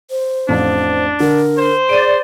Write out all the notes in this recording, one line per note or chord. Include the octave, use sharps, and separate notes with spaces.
C5
A1 F2 D4 D5
D3 A#4
C5
G#4 D5 D7 D#7